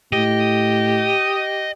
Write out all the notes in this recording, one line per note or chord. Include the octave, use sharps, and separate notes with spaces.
A2 G4 D#5